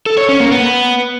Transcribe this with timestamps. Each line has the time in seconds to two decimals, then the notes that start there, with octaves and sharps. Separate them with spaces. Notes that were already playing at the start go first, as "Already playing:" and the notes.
0.06 A4
0.18 C#5
0.29 C#4
0.40 A#3
0.51 B3